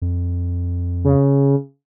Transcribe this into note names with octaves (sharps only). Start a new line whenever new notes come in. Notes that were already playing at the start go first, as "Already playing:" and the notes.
F2
C#3